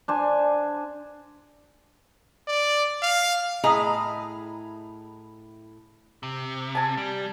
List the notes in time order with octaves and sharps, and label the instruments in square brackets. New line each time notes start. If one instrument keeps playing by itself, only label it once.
[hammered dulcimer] D4 C5 G#5
[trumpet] D5
F5
[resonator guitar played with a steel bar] A2 E4 G#4 D#5 A#5
[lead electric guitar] C3
[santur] G#5 A5
[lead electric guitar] G3